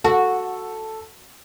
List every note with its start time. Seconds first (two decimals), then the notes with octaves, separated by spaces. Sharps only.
0.04 F#4 A4